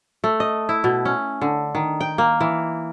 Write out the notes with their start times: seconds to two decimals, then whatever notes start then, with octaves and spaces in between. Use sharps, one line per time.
0.24 A3
0.40 D#5
0.69 E4
0.84 B2
1.05 C#4
1.41 D3
1.75 D#3
2.00 G5
2.18 A#3
2.41 E3